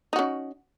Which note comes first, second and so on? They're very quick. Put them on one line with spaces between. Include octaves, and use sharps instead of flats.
D#4 F#4 C#4